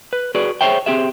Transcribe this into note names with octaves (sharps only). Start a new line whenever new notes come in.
B4
F#4 G#4 B4 D5
G#4 C5 C#5 E5 G5
C4 G4 G#4 E5